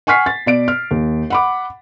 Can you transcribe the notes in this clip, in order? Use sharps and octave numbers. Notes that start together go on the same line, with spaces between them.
F#5 G#5 C#6 F6 B6 C7
A6
B2 D5 D7
F6
D#2
F#5 B5 D6